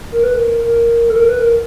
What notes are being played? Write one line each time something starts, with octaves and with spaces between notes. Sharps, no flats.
A#4
B4
A#4
A#4
A4
A#4
B4
A#4